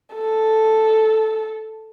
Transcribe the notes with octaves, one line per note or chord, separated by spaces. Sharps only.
A4